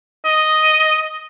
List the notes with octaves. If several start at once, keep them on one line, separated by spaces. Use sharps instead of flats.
D#5